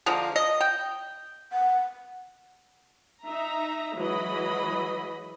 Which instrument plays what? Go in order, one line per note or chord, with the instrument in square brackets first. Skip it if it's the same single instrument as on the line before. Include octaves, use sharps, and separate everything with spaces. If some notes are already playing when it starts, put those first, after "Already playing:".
[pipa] D3 F3 G#3 A#3
D#5
G5
[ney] F#5
[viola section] D#4 E5 A#5
E3 F#3 G#3 D#5 B5